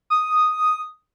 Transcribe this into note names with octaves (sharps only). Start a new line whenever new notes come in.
D#6